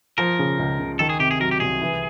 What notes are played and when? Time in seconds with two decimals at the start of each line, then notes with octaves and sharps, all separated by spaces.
0.18 F3 A#4
0.39 C#3
0.59 C#2
0.80 C#2
0.99 D#3 A4
1.09 G#4
1.19 C3 G4
1.31 G#4
1.40 F#3 A#4
1.51 G4
1.60 C2 G#4
1.81 E3